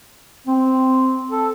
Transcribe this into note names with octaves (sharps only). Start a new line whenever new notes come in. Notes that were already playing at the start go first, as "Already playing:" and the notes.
C4
A4